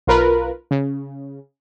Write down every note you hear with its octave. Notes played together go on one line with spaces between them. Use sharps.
B1 F4 A#4 B4
C#3